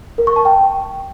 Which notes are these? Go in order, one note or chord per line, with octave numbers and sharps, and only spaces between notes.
A#4
C#6
A5
G5